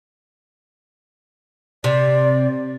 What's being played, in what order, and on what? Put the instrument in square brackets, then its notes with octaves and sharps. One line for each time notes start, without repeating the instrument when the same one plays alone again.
[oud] C3 [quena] D5